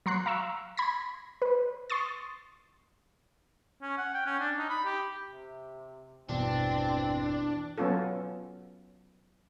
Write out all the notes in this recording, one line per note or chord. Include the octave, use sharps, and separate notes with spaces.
F#3 A#5 C6 F#6
F5 A#5 C#6 E6
B5 G#6 A#6
B4
C6 C#6 D#6 A6
C#4
F#5
G5
C#4
D4
D#4
B5
G4
C3
G#1 E2 G2 B2 E3 C4 D4
F#3 B3 C#4 F4 A4